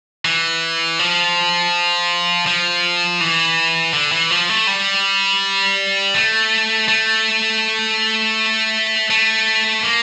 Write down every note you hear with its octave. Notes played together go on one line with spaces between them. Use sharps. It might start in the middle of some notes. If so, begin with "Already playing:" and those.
E3
F3
F3
E3
D3
E3
F3
A3
G3
A3
A3
A3
A#3